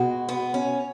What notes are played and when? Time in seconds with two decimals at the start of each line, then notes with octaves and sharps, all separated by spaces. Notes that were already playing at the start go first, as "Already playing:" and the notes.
Already playing: B2 G#3 F#4
0.29 B3
0.54 C#4